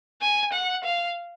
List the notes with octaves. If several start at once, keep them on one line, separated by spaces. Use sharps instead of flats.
G#5
F#5
F5